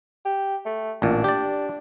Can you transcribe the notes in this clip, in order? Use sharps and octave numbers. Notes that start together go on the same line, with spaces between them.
G4
A3
A1 A#2 D4
G4 D5